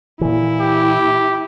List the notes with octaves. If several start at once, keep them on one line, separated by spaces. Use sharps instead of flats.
A#2 E3 E4
G4